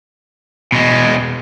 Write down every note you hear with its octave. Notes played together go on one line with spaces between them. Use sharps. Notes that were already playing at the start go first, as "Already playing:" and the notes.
B2 G#3